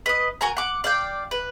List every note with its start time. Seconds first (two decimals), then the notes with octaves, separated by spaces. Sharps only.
0.06 B4 D#5
0.41 F#4 A#4 G#5 A#5
0.57 F#5 D6
0.84 D5 F5 G5
1.31 B4